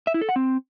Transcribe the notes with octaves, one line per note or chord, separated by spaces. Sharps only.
E5
E4
A4
F#5
C4